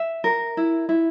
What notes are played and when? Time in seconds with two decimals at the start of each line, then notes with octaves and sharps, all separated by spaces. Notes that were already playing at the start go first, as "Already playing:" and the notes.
Already playing: E5
0.24 A#4
0.57 E4
0.89 E4